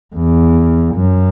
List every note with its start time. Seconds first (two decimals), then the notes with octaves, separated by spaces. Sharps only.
0.15 E2
0.95 F#2